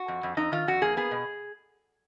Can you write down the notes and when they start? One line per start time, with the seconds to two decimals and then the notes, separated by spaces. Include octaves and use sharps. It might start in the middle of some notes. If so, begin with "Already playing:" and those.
Already playing: F#4
0.08 F2
0.23 F2
0.37 F2 D#4
0.52 D#3 F4
0.67 F2 F#4
0.82 A#3 G#4
0.97 B3 G#4
1.11 B2